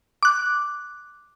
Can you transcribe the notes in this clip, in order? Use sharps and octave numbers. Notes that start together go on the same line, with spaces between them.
D6 F#6